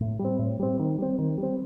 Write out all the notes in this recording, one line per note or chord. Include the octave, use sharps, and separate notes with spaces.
A2
G3
C4
A2
G3 C4
D#3
G3 C4
D#3
G3 C4